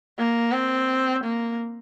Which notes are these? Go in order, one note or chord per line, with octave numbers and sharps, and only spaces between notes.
A#3
C4
A#3